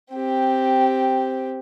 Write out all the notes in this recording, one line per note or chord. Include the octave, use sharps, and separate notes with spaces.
C4 G4